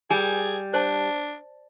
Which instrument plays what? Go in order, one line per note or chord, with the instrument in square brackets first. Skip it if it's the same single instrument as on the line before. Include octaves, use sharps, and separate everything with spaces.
[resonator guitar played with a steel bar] G3 [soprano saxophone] G#4 [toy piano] G#5
[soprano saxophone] D4 [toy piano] C5 A5